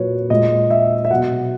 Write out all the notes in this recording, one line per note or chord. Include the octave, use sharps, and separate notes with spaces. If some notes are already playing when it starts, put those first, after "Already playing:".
Already playing: A#2 F#3 B4 C#5
A#2 G#3 D#5
E5
E5
B2 F#3 F#5